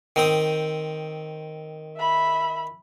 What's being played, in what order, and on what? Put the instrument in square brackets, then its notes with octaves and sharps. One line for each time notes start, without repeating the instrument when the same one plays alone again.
[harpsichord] D#3 C4 D#6
[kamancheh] E5 B5